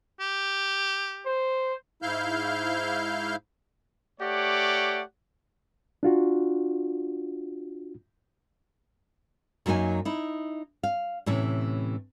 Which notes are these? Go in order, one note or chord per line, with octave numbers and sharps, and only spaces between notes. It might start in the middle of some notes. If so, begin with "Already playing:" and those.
G4
C5
G#2 E4 F5 F6 G6
A3 G4 C#5 D5 F#5
D4 F4 F#4
F#2 F#3 A#3 D#4 G#5
D#4 E4
F5
A2 C3 E3 C#4